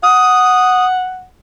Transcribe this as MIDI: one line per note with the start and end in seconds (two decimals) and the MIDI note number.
0.03 1.25 78
0.03 0.86 87